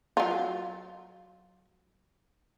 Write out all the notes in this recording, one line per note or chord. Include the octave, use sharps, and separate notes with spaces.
F#3 F4